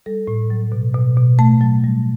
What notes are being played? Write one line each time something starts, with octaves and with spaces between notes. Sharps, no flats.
G3 A4
A2
F#3
B2
B2
B2
A3 A5
F#3
G3